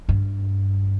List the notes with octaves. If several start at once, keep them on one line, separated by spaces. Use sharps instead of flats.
G2